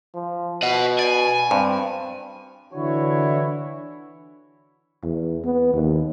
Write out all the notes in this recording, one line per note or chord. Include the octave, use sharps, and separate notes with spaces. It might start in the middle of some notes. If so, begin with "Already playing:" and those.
F3
B2 D#5 F#5
D5 G#5
G2 C4
D3 E3 D4 E4 F#4 C#5
E2
B3
D#2